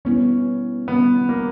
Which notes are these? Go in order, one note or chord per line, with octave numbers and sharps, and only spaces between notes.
G3 B3 C#4 E4
D#3 G3 B3 C#4 E4
A#3